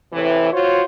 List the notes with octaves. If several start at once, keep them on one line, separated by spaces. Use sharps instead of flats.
A2 C3 E3
F4 F#4 C5 C#5